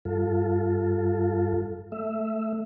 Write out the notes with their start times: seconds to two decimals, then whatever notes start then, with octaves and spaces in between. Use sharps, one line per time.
0.05 G2 F4 A4
1.92 A3 E5